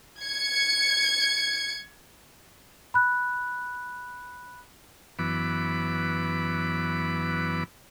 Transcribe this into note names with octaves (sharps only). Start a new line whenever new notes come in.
G#6 C#7
B5 F#6
F#2 E3 B3 B5 D6